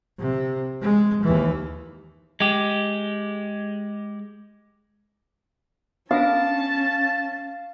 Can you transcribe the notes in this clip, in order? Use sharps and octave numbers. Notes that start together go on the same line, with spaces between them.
C3
G#3
D#2 E3
G#3 G4
B3 C#4 D4 A#4 F5 A5